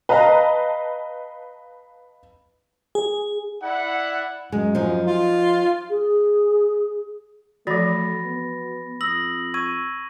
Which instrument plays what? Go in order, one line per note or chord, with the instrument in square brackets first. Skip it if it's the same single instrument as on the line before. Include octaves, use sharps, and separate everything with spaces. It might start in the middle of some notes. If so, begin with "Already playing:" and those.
[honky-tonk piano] B4 D#5 F5 A5 A#5
[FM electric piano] G#4
[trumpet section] E4 D5 F#5
[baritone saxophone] F#2 [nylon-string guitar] G#3
[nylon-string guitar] F3 D#4
[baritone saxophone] F4
[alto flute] G#4
[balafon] E3 F3 [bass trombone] A3 [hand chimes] F#4 [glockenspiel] B5 A6 A#6
[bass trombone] B3
[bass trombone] F2 [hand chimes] D#6 [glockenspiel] E6 A#6 F#7
[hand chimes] C#6 E6 G#6 [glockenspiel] D#7